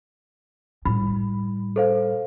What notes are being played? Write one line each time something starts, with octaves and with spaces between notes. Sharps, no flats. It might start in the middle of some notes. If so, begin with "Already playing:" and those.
A2 G3 B5
A4 C5 F5